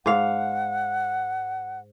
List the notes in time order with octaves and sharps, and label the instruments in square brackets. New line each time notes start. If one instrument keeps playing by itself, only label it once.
[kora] G#2 F5 [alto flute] F#5